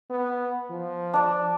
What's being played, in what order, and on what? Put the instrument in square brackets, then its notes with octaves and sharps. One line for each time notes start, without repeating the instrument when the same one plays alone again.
[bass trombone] B3
F3
[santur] D4 D5